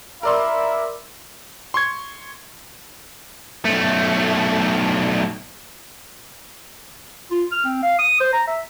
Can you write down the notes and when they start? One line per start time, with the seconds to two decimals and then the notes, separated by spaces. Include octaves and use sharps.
0.23 E4 A#4 D5 E5 C6
1.74 C6 C#6 G#6
3.65 B1 A3
7.31 F4
7.52 F6
7.65 C4
7.82 F5
7.99 D#6
8.21 C5
8.33 A#5
8.47 E5